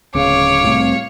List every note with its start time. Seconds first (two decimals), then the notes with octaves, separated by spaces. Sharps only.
0.15 D1 C#3 C#5 F5 D6
0.63 C2 A2 C3